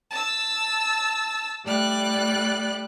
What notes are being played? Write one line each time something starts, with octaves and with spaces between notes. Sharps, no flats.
A5 E6
A2 G3 D5 F#6